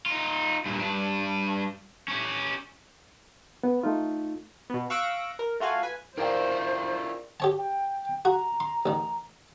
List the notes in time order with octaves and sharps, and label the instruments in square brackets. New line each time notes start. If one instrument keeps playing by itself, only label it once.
[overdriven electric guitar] D#4 F4
G2 A#2
G2 D4
C#4 G4
[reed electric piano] B3
A3 D#4 F4
[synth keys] B2 B3
F5 C#6 E6 F#6 A#6 D7
A#4
A3 F4 F#4 F5 G#5
B4 G#5
[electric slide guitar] E4 F4 G#4 [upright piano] A#4 D5 G5 [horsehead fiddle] C5
[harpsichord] G4 C#5 A5
[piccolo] G5
[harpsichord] F#4 [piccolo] A#5
[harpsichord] C6
A1 D#3